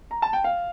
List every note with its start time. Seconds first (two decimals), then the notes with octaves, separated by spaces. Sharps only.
0.11 A#5
0.22 A5
0.33 G5
0.44 F5